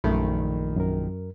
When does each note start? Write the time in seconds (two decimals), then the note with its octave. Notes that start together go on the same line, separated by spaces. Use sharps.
0.04 A#1 F#2 D#3 A3 B5
0.76 F#2 A#4